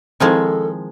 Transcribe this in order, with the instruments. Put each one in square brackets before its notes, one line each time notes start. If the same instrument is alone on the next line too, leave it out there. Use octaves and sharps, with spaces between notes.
[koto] D#3 F3 G#3 [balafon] C4 E4 C5 [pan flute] A4